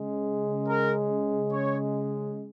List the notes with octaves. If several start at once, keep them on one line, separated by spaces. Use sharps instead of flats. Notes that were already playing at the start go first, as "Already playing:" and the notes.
Already playing: C#3 G#3
A#4
C#5